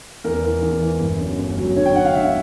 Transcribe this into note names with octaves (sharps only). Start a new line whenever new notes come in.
E2 A#4
E3
E2
E3
G1
F#2
G1
F#3
D3 C#5
G5
D3 F#5
F5
D3 E5